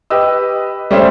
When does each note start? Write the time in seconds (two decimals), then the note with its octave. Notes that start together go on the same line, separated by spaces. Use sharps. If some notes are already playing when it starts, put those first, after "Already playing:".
0.10 G4 B4 D#5 E6
0.91 G3 A3 C#4 C5 E5